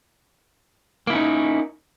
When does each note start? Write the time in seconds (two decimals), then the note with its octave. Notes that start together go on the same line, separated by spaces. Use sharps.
1.07 A#3
1.10 E4
1.13 C#4
1.15 D#4